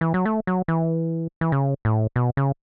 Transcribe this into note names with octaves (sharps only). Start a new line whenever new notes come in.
E3
F#3
A3
F#3
E3
E3
C#3
A2
B2
C#3